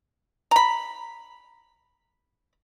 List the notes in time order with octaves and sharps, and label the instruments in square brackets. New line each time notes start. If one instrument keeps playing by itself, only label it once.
[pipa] A#5 B5